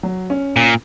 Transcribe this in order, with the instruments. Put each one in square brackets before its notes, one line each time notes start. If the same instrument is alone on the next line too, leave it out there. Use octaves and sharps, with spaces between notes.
[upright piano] F#3
C#4
[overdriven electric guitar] A#2